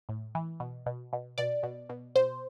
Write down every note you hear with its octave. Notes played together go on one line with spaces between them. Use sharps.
A2
E3
B2
B2
B2
B2 D5
B2
B2
B2 C5